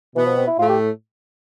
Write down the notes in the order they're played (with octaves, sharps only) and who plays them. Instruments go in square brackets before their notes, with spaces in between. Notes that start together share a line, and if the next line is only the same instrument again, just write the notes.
[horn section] B2 B3 [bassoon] E3
[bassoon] F3
C4
E4
[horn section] A2 A3 [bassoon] F4
[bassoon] G4